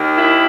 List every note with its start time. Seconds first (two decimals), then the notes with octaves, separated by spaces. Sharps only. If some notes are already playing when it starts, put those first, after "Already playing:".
Already playing: D#2 D#3
0.16 E4